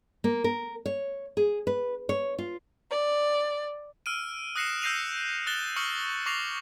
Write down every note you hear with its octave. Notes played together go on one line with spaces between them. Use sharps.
A#3
A#4
C#5
G#4
B4
C#5
F4
D5
E6 F6 D7 D#7
D#6 F#6 A#6 C7 C#7 E7
E6 G6 A#6 C7 D#7 F7
D#6 F#6 A6 E7 G7
C#6 D#6 F6 C#7 F#7
C#6 D6 A#6 C7 F7